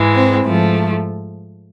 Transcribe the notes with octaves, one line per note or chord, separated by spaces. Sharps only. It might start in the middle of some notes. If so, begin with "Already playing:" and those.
Already playing: G#2 E3 G#3
C4
G#2 F3 A3